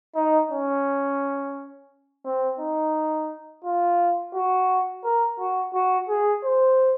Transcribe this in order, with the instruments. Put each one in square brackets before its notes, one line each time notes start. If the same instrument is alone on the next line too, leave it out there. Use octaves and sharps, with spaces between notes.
[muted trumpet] D#4
C#4
C4
D#4
F4
F#4
A#4
F#4
F#4
G#4
C5